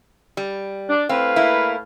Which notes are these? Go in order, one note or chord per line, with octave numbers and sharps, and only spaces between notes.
G3
D4
A2 C4 B4 F5
A#3 E4